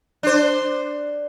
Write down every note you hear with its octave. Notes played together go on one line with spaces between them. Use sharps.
D4 C5